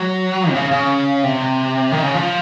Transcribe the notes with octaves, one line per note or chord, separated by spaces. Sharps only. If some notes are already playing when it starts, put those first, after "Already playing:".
Already playing: F#3
C3
C#3
C#3
C3
D#3
C#3
F3